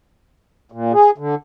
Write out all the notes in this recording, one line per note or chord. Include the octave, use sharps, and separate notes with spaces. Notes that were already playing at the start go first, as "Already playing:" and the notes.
A#2
G#4
D3